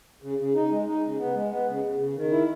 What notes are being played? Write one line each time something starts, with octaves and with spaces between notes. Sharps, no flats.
C#3
C#3
D#4
G#3
D#4
C#3
B3
G#3
B3
C#3
C#3
C#3
D#3
E4